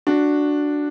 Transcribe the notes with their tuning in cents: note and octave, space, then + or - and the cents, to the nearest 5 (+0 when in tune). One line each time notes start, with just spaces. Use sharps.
D4 +0 F#4 -5